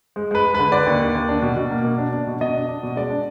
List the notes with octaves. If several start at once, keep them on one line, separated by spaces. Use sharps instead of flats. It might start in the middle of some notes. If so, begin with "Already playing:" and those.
G#3
G#3 B4
G#3
D3 B4
D3 D5
D#2
D#2
D#2
D4
B2
B2
A#3
B2
D4
D4
B2
B2 D#5
D4
D4
B2
G#3 D5
D4